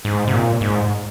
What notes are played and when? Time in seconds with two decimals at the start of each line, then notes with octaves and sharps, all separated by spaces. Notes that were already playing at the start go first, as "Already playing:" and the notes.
0.05 G#2
0.27 C3
0.33 A#2
0.61 G#2